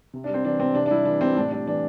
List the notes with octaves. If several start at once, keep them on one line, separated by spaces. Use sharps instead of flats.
C3
D4
G3
C4
E3 D4
C3 C4
C3 D4
D4
G3 E4
E3 D4
C3 C4
A2 D4
G3 D4
E3 D4